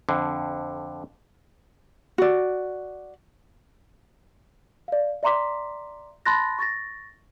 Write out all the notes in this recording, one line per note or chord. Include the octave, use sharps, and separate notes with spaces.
F2 D3
F#4 D5
D5 F5
D5 E5 A#5 C6 D6 B6
A5 B5 C6 F#6 A6 A#6
C#6 A6 A#6